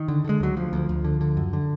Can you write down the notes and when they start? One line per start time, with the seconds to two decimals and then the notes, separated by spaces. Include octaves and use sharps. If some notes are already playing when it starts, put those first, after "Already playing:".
Already playing: D#3
0.08 D3
0.24 D3 G#3
0.40 D2 F#3
0.57 D2 F3
0.73 D2
0.89 D2
1.04 D3
1.21 D3
1.37 F#2
1.53 D3